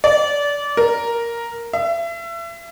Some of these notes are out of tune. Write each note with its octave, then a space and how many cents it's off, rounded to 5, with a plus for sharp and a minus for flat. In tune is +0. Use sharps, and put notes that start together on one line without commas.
D5 -25
A#4 +0
E5 +35